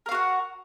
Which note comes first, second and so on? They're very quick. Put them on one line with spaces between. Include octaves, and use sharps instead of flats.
A#4 F5 F#4 F#5